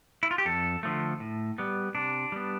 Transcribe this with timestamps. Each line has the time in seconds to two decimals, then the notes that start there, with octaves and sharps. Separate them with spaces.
0.23 E4
0.31 F4
0.38 G4
0.45 F2 A4
0.83 D3 F3 A3
1.20 A2
1.58 G3 B3
1.95 C3 D4
2.32 G3 B3